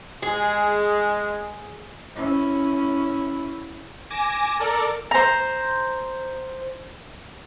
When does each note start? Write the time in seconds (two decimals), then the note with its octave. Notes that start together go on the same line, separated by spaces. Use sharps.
0.22 G#3 G#4
2.16 C#4 E4
4.10 G#5 D6 A#6 E7
4.59 A4 A#4 D5
5.11 C5 A#5